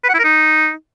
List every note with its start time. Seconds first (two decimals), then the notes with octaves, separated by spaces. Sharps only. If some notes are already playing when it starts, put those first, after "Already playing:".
0.04 B4
0.09 F#5
0.14 E4
0.19 A#4
0.24 D#4